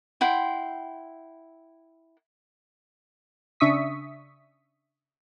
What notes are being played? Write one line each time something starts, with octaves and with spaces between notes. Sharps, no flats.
E4 F#5 G5 C6
C#3 D4 E5 C#6 D#6 B6